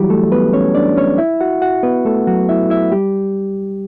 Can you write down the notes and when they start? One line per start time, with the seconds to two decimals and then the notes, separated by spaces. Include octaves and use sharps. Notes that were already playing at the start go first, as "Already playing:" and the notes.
Already playing: E3 F#3 G3 E4 F#4 G4
0.10 A3 A4
0.32 B3 B4
0.53 C#4 C#5
0.75 D4 D5
0.96 C#4 C#5
1.18 E4 E5
1.41 F#4 F#5
1.62 F#4 F#5
1.83 B3 B4
2.05 A3 A4
2.27 F#3 F#4
2.49 E4 E5
2.70 E4 E5
2.92 G3 G4